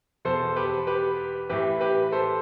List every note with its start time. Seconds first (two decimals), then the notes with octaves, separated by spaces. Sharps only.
0.25 E2 B2 A4 C5
0.56 G4 B4
0.87 G4 B4
1.50 A2 E3 G4 B4
1.81 G4 B4
2.12 A4 C5